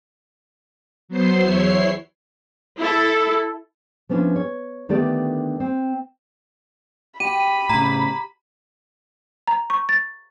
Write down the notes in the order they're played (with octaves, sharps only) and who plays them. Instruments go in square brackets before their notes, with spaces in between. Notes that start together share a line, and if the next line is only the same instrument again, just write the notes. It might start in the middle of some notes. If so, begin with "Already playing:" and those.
[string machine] F#3 B3 C5 C6
E2 E4 C#5 C7
[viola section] E4 A4
[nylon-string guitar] F3 B3 C#4 D4 E4
C#5
D3 D#3 A3 B3 G4 D5
C4
[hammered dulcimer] G4 [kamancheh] B5 [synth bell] D#7
[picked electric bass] A2 C#3 [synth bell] A#5
[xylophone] A#5
C#6
A6